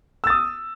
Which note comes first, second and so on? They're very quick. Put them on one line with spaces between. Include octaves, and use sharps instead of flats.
E6 A6 D#6